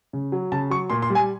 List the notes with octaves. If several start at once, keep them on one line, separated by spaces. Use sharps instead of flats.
C#3
F#3
C#3 A5
F#3 C#6
A#2 C6
C6
G3
G#5